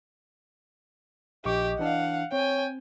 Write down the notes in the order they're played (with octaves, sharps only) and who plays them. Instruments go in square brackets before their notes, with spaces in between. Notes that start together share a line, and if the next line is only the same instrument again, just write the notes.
[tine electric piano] A#1 C#6 D6 [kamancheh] G4 [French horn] D#5
[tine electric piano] E3 D4 [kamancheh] F5 F#5
[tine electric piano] C4 [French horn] C#5 [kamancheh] G5 G#5